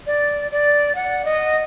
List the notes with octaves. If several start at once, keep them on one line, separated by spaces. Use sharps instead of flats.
D5
D5
F#5
D#5